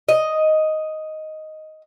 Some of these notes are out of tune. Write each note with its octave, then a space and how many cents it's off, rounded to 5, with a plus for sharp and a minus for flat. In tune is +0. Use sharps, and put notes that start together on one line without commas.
D#5 +5